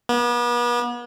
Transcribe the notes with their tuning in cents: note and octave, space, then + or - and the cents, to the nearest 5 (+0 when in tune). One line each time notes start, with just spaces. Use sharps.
B3 -40